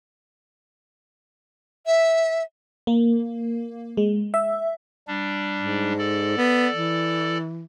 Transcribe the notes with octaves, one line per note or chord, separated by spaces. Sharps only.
E5
A#3
G#3
E5
G3 D4
G#2
A4 D5
B3
E3